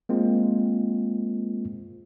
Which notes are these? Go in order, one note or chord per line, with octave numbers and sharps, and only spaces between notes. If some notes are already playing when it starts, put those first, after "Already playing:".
G#3 A#3 C4 F4